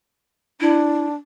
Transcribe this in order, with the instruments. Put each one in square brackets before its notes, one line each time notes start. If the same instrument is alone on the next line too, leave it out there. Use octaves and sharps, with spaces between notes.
[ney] D4 [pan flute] E4